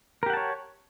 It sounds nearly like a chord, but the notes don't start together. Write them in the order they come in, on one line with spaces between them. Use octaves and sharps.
A#4 G4 F#5 A5 C#5